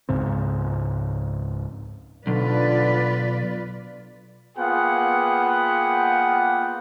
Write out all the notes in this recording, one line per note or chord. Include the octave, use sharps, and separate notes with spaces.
C#2 G#2 C#3 C4
B1 D3 F4 B4 D5
A#3 B3 F4 G#4 F#5 G5